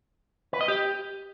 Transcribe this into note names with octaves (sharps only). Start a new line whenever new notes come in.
B4
D#5
G4